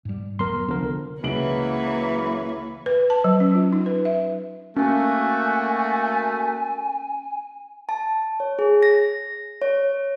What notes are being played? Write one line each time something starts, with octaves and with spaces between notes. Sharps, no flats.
G#2 G3
F1 F#3 B3 A#4 C6
C2 D3 F3 B3 A#4
C#2 E3 F#3 A#3 B4 C#5 D7 F#7
B4
A5
F#3
C#4
F4
D#4
B4
E5
A3 A#3 C#4 F#4 G#5
A5
C#5
G#4
A#6
C#5